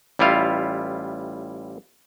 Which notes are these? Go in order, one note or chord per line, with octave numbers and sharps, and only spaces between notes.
A1 G3 E4 F4 F5